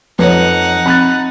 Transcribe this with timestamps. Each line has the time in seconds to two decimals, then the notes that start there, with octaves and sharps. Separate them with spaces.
0.19 F2 D#4 B4 C#5 F#5
0.86 C4 B5 F#6 A6